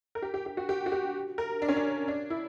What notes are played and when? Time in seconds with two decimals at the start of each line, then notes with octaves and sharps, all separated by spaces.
0.15 A#4
0.22 G4
0.34 G4
0.46 G4
0.57 F#4
0.69 G4
0.86 F#4
0.92 G4
1.38 A#4
1.62 D4
1.68 C#4
1.76 D4
2.08 D4
2.30 E4